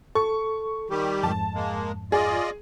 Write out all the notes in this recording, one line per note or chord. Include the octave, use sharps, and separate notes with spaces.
A4 C#6
D#3 G3 G4
F2 G#2 A5
G#3 A#3
F4 G#4 D5 D#5